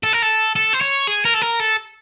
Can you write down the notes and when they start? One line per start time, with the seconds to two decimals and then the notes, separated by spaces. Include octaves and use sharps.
0.03 A4
0.13 A#4
0.23 A4
0.56 A4
0.73 C5
0.81 C#5
1.07 G#4
1.25 A#4
1.34 A4
1.42 A#4
1.60 A4